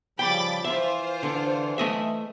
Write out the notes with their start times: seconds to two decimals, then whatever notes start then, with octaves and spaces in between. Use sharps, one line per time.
0.19 C#3 F3 G3 G5 B5 D6 A6
0.64 E3 F4 C5 E5
1.23 D3
1.78 A3 D#5 E5